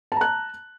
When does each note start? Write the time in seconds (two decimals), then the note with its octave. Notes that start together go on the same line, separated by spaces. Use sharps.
0.12 A5
0.16 A#5
0.21 F#6